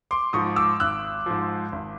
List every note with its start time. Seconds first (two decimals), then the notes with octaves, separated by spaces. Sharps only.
0.11 C6 D6
0.33 G#2 F3 C#6 D#6
0.56 D6 E6
0.80 G#1 E6 F#6
1.26 G#2 F3
1.72 G#1